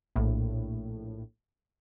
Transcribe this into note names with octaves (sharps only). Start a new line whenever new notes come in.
A#1 A2